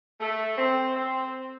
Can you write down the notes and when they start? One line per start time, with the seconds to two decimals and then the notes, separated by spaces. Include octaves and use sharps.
0.20 A3
0.57 C4
0.96 C4